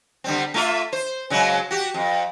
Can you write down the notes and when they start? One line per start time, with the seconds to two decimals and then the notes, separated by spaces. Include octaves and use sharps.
0.24 D3 G3 C4
0.54 A3 F4 E5
0.93 C5
1.30 C#3 F#3 G#3
1.71 F#4 G4
1.94 F2